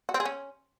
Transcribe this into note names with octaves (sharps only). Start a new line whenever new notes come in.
F#4
C4
G#4
C#4